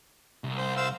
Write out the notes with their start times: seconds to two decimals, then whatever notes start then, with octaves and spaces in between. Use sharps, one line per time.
0.44 C2
0.57 C5
0.76 C5 F5 E6